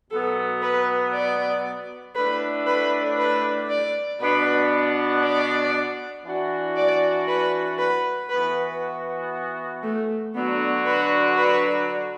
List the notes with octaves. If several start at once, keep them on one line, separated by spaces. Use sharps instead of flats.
B2 F#3 B3 A4
B4
D5
A2 A3 D4 B4
B4
B4
D5
B2 B3 D4 B4
D5
E3 D4 F#4
D5
B4
B4
E3 B3 F#4 B4
A3
D3 F#3 B3 D4 F#4
B4
B4